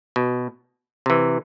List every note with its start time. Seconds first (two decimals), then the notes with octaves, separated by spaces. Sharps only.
0.16 B2
1.06 C3 E3